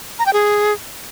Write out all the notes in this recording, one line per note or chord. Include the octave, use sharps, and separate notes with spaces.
A#5
G5
G#4